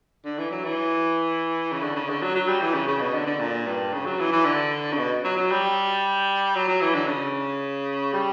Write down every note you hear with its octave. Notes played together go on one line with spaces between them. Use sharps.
D3
E3
F#3
E3
C#3
D3
C#3
D3
F#3
F#3
G3
E3
C#3
C#3
B2
D3
D3
A#2
G2
C#3
F#3
E3
E3
D3
C#3
B2
F#3
F#3
G3
F#3
F#3
E3
D3
C#3
G3